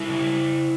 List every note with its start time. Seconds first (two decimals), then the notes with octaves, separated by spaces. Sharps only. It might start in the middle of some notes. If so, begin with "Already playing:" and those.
Already playing: G3 E4
0.09 C#3